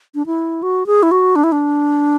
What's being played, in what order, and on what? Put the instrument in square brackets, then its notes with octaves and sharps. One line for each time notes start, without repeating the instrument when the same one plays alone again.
[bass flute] D4
E4
F#4
G#4
E4
F#4
D4
E4
D4